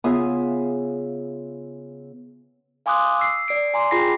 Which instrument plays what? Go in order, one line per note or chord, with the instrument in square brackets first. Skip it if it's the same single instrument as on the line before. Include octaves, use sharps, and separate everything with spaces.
[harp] C#3 B3 F4 E5 G#5 D#6
[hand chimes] F5 G#5 C6 D6 D#6 F#6
E6 C7
D5 C7 D7
G#5 A#5 C6 D6
F4 G#4 G5 B5 A#6 C7